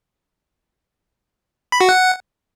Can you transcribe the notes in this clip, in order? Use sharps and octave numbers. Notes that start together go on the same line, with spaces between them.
B5
F#4
F#5